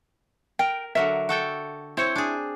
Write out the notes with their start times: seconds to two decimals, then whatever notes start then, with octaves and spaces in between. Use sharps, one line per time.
0.59 A#4 G5
0.95 D3 F#3 A#4 E5
1.29 F#4 A4 G5
1.97 C4 E4 C5 C#5
2.15 D4 G#4